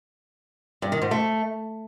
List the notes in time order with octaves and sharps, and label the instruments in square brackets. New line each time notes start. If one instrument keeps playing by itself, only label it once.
[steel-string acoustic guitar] G2
D#3
G#2
A3